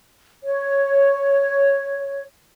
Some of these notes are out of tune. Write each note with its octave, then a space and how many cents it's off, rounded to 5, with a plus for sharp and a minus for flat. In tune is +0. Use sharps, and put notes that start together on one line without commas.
C#5 +0